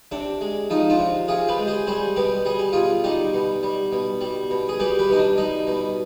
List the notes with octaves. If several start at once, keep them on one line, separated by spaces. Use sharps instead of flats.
C3 D4
G#3
F3 D#4
D4 F4
C3
C3 F4 G#4
G4 B4
G#3
G#4 C5
G3 G#4 C5
B2 G4 B4
G3 G#4
G4
B2 F4 G#4
G3 D#4 G4
B2
G3
B2
G3
B2
G#4
G3 G4 B4
G4 B4
B2 D#4
D4
G3 D#4
B2